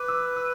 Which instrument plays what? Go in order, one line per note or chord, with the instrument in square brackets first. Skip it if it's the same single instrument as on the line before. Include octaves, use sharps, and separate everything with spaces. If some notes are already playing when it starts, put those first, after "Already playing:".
Already playing: [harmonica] B4 [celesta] D6
[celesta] E6
E6